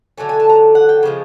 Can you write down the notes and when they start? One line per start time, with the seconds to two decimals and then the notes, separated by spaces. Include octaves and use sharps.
0.18 D3 F#3 A3 G#5
0.29 G#5
0.40 A5
0.49 A#5
0.75 F#5
0.89 G5
1.03 C#3 F3 G#3